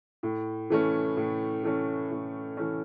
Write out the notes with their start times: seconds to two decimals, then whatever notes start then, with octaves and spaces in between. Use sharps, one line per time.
0.23 A2
0.70 E3 A3 C#4
1.17 A2
1.63 E3 A3 C#4
2.11 A2
2.57 E3 A3 C#4